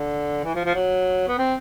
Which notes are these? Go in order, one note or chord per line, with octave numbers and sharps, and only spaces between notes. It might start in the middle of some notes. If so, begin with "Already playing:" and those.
Already playing: D3
E3
F3
F3
F#3
B3
C4